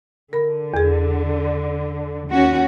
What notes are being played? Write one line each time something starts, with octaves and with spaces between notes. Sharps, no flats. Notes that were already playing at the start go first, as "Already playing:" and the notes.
D3 A#4 B5
E2 G#4
D#2 C#4 F#4